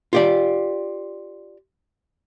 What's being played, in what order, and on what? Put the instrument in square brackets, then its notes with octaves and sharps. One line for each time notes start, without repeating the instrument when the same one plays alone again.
[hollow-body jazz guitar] F4 G4 D5